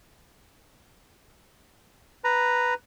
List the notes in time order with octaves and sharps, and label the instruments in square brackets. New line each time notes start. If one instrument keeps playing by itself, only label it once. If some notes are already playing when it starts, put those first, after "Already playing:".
[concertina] B4 A#5